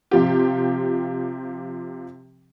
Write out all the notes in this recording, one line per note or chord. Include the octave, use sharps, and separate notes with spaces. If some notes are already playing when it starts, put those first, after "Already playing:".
C3 F3 G4